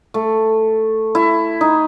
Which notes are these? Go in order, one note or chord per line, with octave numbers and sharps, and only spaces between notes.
A3
E4
D#4